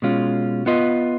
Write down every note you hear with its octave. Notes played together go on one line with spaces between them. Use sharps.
B2 G#3 C#4 F4
B3 F4 B4 D#5